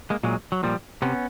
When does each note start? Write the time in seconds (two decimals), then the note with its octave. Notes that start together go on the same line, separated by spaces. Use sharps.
0.10 G#3 A#3
0.24 A#2 F#3 G#3
0.52 F#3
0.63 A#2 F3 G3
1.02 C3 B3 C#4